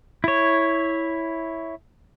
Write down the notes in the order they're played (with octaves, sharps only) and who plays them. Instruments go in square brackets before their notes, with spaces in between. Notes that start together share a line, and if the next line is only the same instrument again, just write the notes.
[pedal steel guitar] E4 C#5